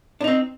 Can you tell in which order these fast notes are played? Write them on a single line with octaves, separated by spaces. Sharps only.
D4 D#4 C4